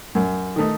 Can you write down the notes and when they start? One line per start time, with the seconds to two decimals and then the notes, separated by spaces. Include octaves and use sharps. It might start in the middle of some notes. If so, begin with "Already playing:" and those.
0.15 F#2
0.56 D#3 A3 D#4